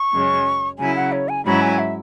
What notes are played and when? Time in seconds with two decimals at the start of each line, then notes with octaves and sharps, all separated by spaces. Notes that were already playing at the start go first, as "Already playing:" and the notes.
Already playing: C#6
0.13 F#2 C#3 G#3 C#4
0.79 C#3 F#3 E4 G#5
0.96 F#5
1.12 C#5
1.29 G#5
1.45 G#2 F#3 C#4 E4 B5
1.62 G#5
1.79 E5